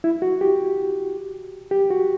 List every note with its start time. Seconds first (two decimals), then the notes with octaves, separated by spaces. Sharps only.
0.04 E4
0.22 F#4
0.41 G4
1.71 G4
1.90 F#4